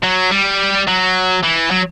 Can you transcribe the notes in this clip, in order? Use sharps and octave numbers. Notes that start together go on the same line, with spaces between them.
F#3
G3
F#3
E3
F#3